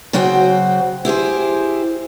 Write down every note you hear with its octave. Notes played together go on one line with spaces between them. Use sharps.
C#3 F#3 F#4 C5 G5
E4 G4 G#4 C5